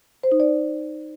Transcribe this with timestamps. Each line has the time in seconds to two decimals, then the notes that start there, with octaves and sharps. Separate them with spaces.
0.23 C5
0.32 D#4
0.40 D5